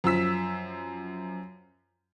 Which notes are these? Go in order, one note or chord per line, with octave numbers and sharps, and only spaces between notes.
F#2 F3 E6 B6